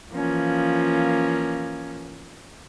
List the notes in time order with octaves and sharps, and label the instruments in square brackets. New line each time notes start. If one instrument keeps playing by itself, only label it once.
[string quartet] E3 F3 A#3 C#4